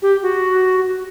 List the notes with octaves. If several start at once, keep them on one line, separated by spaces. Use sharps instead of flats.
G4
F#4